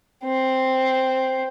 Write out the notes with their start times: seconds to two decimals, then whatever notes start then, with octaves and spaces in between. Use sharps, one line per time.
0.24 C4